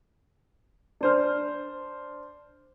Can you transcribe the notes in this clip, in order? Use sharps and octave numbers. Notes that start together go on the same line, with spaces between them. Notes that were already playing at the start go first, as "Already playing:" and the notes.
D4 C5 F6